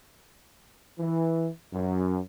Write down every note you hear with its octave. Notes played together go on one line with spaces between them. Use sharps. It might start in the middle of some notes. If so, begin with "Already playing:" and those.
E3
F#2